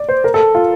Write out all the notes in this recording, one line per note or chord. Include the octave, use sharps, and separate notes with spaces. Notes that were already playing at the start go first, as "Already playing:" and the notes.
Already playing: D5
C5
A#4
A4
F4